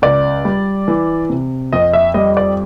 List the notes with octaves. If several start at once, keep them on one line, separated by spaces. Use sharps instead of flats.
C#2 D5
G3
E3
C3
F2 D#5
E5
G3 D#5
D5